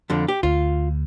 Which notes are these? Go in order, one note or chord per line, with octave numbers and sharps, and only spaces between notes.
F2 D3
G4
D2 F4